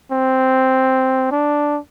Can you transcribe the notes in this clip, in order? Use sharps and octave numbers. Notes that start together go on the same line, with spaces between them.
C4
D4